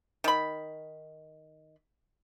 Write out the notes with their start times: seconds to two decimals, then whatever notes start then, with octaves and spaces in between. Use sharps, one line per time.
0.24 D#3 B5